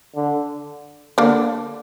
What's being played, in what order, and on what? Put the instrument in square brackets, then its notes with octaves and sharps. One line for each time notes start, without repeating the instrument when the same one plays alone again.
[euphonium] D3
[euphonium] D3 [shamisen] A#3 D4